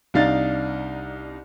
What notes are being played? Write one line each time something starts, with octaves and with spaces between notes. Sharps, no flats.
C2 D4 D#4 F5 A6